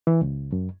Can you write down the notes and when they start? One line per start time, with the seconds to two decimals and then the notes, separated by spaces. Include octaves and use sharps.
0.07 E3
0.21 C#2
0.52 F#2